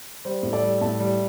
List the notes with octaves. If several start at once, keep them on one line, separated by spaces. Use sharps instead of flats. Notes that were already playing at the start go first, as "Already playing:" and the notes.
G3 C5
A2
A4 D5
G3
A2 E5 A5
G3